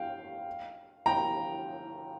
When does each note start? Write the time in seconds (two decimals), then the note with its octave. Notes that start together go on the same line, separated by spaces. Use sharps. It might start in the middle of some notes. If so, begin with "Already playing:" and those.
Already playing: F5 G5
1.06 G5 A#5